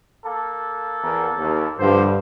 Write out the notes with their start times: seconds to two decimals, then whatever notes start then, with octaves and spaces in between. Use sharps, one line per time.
0.25 A#3 A4
1.02 E2 A#4
1.38 D#2
1.79 G2 D3 F3 C5